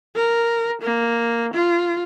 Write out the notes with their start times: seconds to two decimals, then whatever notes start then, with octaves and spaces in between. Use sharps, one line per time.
0.16 A#4
0.82 A#3
1.54 F4